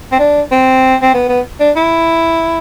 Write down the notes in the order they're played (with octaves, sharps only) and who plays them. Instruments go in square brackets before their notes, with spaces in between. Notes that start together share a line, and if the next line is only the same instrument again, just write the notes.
[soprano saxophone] C4
D4
C4
C4
B3
B3
D4
E4